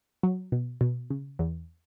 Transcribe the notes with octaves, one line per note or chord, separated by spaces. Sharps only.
F#3
B2
B2
C#3
E2